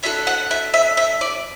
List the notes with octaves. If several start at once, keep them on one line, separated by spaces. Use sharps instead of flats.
B3 D4 F#4 A4 E5
F#5
E5
E5
E5
D5